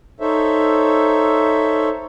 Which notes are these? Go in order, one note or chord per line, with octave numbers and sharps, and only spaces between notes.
D#4 A4 C5 C#5 E5